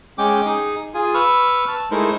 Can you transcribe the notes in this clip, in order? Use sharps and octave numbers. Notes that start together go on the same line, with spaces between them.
G#3 C#4 G5 D6
D#4 G#4
F4 G#4 G#5
B4 B5 C#6 E6 F6
A5
G#3 A3 D#4 E4 A#4 C5